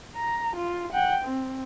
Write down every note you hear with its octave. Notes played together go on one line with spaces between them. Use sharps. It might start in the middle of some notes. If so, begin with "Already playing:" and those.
A#5
F4
F#5 G5
C4